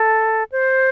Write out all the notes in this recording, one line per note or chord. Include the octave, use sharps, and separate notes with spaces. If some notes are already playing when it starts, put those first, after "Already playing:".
Already playing: A4
C5